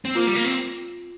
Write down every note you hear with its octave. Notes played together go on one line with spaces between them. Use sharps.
C4
A#3 F4
G3
A#3
C4